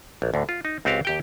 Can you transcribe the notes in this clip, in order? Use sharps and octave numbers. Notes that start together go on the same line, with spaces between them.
A#1
D2 A2 D3
F4
D#4
C#2 C4 F#4 G4 F5
D#2 G4 G5